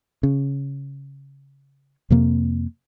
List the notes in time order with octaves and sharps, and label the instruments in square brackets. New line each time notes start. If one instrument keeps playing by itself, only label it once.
[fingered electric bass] C#3
F2 C3 A#3